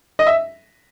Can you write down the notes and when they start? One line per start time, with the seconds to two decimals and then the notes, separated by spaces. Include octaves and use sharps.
0.19 D#5
0.27 E5